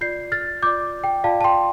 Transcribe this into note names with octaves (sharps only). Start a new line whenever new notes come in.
F4 D5 G6 C7
F6 A6
F4 D5 D6 G6
G5
F4 D5 F5 A5
A5
G5 C6